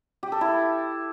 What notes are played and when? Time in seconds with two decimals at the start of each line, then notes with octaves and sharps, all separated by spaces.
0.23 G4
0.32 A4
0.41 E4